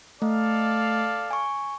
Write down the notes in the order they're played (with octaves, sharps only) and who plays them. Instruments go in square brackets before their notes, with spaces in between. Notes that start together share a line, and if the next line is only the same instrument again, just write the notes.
[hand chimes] A3 [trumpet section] A4 D5 F5
[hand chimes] G#5 C#6